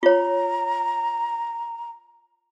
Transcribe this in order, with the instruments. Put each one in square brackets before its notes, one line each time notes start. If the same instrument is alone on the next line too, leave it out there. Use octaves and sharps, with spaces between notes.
[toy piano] F4 C#5 [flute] A#5